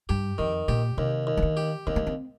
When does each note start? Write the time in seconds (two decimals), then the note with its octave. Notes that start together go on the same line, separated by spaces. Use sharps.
0.09 G2 G4
0.38 F2 D#3
0.68 A#2 G4
0.97 D#2 C3
1.27 D#2
1.37 F3
1.42 D#3
1.57 G4
1.87 D#2 C4
1.96 A#3
2.07 C4